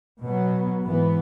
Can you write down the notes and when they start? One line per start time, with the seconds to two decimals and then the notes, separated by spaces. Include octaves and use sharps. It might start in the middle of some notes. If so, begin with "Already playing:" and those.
0.22 B2 F#3 B3
0.84 G#2 E3 B3